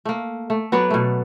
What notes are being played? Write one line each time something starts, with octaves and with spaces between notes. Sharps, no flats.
A3 A#3
A3
F#3 B3 B4 D5
B2 A3